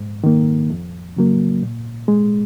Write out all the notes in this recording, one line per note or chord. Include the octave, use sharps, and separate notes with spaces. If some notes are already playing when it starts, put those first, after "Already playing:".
Already playing: G#2
D#3 A#3
F2
C#3 F#3 A#3
A#2
G#3